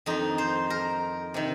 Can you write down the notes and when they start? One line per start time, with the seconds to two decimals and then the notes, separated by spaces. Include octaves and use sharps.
0.06 F2 D#3 D#4
0.38 C5
0.70 A#4
1.34 C3 D#3